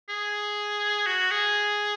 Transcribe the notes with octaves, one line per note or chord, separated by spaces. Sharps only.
G#4
F#4
G#4